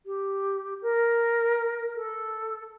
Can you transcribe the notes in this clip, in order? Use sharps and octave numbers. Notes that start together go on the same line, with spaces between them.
G4
A#4
A4